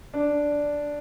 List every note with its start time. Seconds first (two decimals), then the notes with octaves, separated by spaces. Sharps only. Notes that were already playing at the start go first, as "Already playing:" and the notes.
0.14 D4